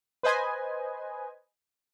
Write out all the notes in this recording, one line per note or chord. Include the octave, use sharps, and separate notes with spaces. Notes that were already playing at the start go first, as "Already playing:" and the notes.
B4 C5 D#5 G#5